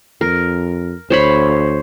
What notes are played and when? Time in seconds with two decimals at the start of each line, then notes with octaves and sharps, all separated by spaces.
0.21 F2 A#4
1.10 D2 C5 C#5 B5